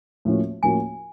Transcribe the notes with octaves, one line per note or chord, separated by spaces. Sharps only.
A2 F3 A#3 C#4 F#4
A2 F3 A#3 C#4 F#4 G#5